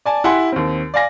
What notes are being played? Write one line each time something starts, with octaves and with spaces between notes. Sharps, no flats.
D5 G#5 A5
E4 G4 F#5 G#5 B5 C6
D#2 C4
D5 F5 G#5 A#6